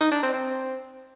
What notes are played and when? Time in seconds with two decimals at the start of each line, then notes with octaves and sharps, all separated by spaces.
0.01 D#4
0.11 D4
0.22 C4
0.33 C4